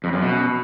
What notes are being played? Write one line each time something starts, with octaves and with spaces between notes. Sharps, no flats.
F2
F#2
B2